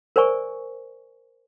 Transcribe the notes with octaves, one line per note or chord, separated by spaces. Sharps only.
A#4 C5 D5 G#5 C#6